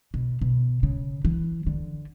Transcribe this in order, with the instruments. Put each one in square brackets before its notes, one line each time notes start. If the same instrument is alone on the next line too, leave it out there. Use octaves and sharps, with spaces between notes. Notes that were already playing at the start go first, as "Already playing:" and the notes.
[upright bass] B2
B2
C#3
E3
D3